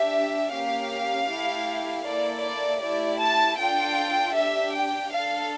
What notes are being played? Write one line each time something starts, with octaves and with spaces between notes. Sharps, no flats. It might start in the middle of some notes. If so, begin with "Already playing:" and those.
Already playing: D4 G4 E5
A#3 C#4 G4 F5
A3 E4 G4
A#3 E4 A4 D5
D5
A3 E4 G4 D5
A5
D4 F4 A4 G5
D4 G4 E5
G5
D4 A4 F5